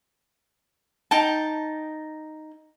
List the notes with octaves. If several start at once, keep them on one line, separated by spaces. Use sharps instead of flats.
D#4 G5 A5